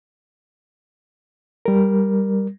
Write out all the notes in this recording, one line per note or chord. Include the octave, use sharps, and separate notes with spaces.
G3 A#4